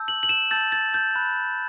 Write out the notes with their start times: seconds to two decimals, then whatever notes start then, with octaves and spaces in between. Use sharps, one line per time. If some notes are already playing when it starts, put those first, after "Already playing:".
Already playing: A5 E6 G6
0.08 F#7
0.23 F#7
0.29 E7
0.51 A5 E6 G6 A6
0.72 A6
0.94 G6
1.15 B5 F#6